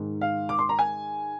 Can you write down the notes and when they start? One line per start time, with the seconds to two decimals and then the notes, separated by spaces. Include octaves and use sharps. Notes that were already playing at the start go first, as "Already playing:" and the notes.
Already playing: G#2 D#3
0.21 F5
0.49 D6
0.59 C6
0.69 A#5
0.79 G#5